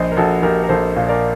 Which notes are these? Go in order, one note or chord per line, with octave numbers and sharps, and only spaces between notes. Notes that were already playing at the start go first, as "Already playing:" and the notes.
Already playing: A#1 C5 D#5
A#4
A#1 F#4 A4
A#1 G4 A#4
A#4
A#1 A4 C5
A#2
A#4 D5